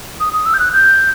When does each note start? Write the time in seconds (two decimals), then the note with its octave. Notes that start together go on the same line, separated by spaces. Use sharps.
0.20 D#6
0.33 D#6
0.46 E6
0.54 G6
0.59 F#6
0.73 G6